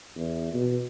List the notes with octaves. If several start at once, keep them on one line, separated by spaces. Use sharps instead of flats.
E2
B2